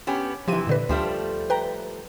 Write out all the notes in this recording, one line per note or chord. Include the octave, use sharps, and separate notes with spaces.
B3 C#4 G4
C3 E3 F3 G4 D#7
A#2 D3 B4
D2 F3 G3 A3
B4 G5 A#5